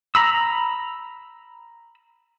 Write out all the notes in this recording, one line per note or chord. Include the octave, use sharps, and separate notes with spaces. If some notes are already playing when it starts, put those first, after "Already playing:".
A#5 B5 E6